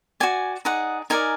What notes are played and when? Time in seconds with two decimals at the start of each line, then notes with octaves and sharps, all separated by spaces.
0.20 F#4 D5 G#5
0.65 D#4 G#4 D5 F#5
1.10 D#4 A#4 D5 G#5